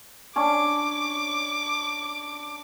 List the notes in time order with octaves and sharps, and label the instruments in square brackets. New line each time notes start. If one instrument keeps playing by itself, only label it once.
[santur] C#4 D4 [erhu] D6